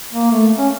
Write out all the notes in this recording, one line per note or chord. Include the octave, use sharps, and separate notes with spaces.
A#3
A3
C#4